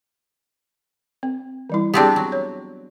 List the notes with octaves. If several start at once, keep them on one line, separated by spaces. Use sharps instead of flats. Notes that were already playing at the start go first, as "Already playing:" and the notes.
C4
E3 G3 E4
B3 C4 D4 G4 G#4
F#3
C#5